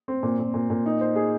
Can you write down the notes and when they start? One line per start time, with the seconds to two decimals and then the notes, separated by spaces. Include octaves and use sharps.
0.08 C4
0.23 A#2
0.39 A#2
0.54 A#2
0.70 A#2
0.86 D#4
1.01 C5
1.16 G#4